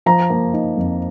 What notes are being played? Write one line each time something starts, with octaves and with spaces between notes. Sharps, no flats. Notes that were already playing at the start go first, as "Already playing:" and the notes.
F3 A#5
A#3
D#4
F2